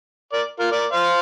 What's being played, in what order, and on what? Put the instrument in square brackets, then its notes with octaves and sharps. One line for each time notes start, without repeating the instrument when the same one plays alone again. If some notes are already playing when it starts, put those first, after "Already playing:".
[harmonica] A#4 D5
F4 A#4
A#4 D5
C5 F5